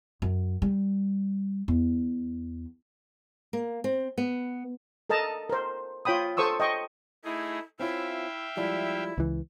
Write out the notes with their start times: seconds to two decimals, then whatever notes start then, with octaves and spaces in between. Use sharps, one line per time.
0.22 F#2
0.62 G3
1.68 E2
3.53 A#3
3.84 C4
4.18 B3
5.10 A4 A#4 D#5 A5 A#5
5.49 A#4 C5
6.05 F4 C#5 G5 B5 D#6
6.37 A4 C5 C#6 D#6 E6
6.60 D#5 G5 C#6
7.24 A3 D#4 E4 G#4
7.79 C4 C#4 E4 F4 E5 F5 G5
8.57 F3 G3 G#3 E4
9.18 C#2 E3